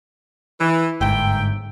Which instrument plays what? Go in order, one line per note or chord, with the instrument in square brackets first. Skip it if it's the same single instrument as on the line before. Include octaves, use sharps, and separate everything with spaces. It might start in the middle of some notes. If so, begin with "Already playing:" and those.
[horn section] E3
[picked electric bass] G1 G#2 [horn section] A#3 E5 G5